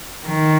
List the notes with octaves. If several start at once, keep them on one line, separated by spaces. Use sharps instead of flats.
D#3